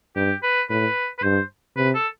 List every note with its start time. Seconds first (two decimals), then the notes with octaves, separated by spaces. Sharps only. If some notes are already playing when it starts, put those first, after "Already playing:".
0.16 G2 G4
0.43 B4
0.70 A2 B4
1.18 B4
1.23 G2 C5
1.77 C3 B4
1.95 A4